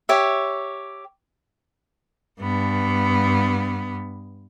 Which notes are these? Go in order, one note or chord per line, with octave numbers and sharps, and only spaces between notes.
G4 C#5 E5
G2 B3